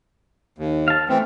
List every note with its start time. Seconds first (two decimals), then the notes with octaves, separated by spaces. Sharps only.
0.58 D#2
0.88 F5 A5
1.09 E3 A3 C4